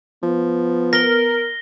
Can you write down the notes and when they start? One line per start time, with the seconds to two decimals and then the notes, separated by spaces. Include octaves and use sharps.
0.23 F3 B3
0.93 A#4 A#6 G7